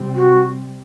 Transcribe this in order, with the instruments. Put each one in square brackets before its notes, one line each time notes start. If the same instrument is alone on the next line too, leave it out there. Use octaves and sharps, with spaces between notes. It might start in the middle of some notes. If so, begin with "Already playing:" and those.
Already playing: [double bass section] C3 G3 C4
[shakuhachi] F#4